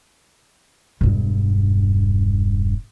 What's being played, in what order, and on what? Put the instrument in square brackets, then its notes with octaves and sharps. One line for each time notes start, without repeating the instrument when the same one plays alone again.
[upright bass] E1 G2